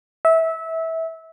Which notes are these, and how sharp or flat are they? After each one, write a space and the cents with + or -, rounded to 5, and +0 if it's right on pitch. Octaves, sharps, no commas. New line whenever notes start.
E5 -20